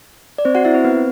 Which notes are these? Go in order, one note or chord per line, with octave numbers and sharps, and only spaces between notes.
D5
C4 C5
F#4 F#5
E4 E5
C4 C5
B3 B4